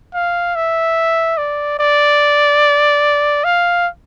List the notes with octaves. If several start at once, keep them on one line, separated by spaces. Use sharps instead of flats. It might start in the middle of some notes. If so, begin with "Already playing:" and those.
F5
E5
D5
D5
F5